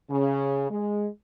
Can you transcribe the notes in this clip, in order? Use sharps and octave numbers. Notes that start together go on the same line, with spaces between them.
C#3
G#3